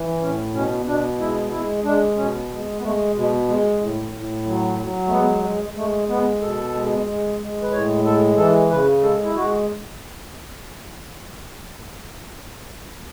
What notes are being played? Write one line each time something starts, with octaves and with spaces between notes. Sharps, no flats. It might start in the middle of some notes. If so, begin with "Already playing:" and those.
Already playing: E3
A2 C#4
B2 C#4
B2 D4
G#3 E4
G#3 E4
G#3 D4
B2 C#4
G#3
B3
G#3 A3
B2 G#3
G#3
A2
A2
F#3
F#3
A3
G#3 B3
G#3
G#3
G#3 A3
G#3 B3
B2 A4
G#3
G#3
G#3
B4
A2 C#5
G#3 A4
E3 A4
C#3 B4
G#3 A4
E4
G#3 F#4